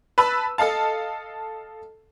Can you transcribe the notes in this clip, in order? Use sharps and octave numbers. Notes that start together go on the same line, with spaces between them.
B4 A5 B5 E6
A4 D#5 F5 A5